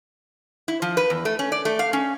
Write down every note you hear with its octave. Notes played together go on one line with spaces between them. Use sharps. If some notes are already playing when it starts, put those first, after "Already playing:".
E4
F3
B4
E2
A3
C#4
D5
A3
F5
C#4